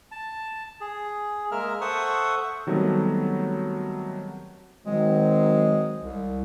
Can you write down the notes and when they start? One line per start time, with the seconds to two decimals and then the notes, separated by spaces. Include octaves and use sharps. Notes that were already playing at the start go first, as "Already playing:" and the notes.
0.12 A5
0.81 G#4
1.52 G#3 A#3 A#4 E5 F6
1.81 A4 C5 E5 F#5 C#6 D#6
2.67 D#3 F#3 G3 A3 B3 C4
4.86 D#3 F#3 G#3 C4
6.03 C2